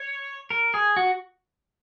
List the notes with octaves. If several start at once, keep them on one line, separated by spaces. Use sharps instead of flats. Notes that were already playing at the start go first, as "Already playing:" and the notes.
Already playing: C#5
A#4
G#4
F#4